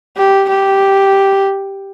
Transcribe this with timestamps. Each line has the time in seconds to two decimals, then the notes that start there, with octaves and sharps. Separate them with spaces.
0.17 G4
0.48 G4